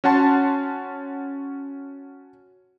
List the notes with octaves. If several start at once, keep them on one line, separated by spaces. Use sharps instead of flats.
C#4 F#4 F#5 A5 C6